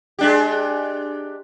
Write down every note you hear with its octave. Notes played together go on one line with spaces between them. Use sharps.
G#3 D4 G4